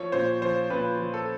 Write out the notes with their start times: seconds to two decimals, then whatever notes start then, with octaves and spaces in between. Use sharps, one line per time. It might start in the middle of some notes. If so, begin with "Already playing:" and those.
Already playing: F3 C#5
0.12 A#2 C5
0.42 F3 C5
0.70 A#2 B4
0.98 F3
1.14 A4